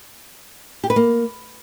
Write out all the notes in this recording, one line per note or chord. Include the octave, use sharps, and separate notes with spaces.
G4
B4
A#3